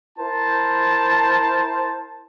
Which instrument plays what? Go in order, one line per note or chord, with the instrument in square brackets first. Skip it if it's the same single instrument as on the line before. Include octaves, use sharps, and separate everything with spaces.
[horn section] E4 A#4 C5 A5